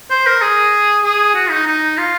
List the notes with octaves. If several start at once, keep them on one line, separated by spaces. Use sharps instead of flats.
C5
A#4
G#4
G#4
F#4
D#4
D#4
F4